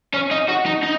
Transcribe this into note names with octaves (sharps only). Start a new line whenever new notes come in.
C#4
D#4
F#4
D#4
D#4